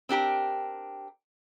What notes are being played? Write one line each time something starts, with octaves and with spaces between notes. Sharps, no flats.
C4 D4 G4 A#4